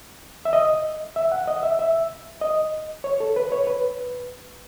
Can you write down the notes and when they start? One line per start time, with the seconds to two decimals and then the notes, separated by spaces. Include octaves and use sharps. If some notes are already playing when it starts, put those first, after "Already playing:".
0.45 E5
0.53 D#5
1.16 E5
1.32 F#5
1.47 D#5
1.63 E5
1.79 E5
2.41 D#5
3.04 C#5
3.20 A4
3.36 B4
3.52 C#5
3.67 B4